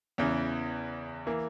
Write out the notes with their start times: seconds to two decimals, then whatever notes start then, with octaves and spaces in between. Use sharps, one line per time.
0.18 E2 C#3 E3
1.27 E3 A#3